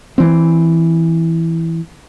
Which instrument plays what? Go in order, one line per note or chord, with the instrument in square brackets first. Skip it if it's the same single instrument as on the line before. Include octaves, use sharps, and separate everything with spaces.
[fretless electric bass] E3 C4